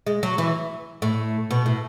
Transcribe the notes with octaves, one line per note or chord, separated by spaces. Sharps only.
G#3
F#3
E3
A2
B2
A2